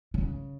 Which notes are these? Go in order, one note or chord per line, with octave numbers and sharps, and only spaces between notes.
C#3